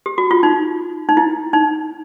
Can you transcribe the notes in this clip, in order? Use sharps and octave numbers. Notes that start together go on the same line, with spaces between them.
G4
F#4
F4
D#4
D#4
E4
D#4